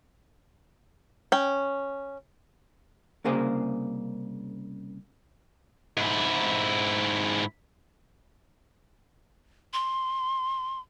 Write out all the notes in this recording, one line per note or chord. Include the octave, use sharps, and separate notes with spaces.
C#4 G5
C2 C#3 A#3 G#4 C5
G#2 E4
C6